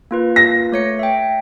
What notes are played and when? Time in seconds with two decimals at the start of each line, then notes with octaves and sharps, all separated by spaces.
0.11 A#3 F4 B4
0.36 A#6
0.72 A3 C#5 C#7
0.99 E5 G5